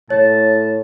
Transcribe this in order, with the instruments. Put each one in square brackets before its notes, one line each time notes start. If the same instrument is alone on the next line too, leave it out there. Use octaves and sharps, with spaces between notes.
[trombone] A2 [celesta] C#5 [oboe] A5